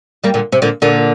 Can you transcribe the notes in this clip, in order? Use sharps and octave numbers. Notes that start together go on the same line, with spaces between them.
G3 A#3
A#2 D3
C3
A#2 D3
A#2 D3